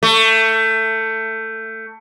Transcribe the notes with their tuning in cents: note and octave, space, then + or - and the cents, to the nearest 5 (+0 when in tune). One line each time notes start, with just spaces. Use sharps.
A3 +20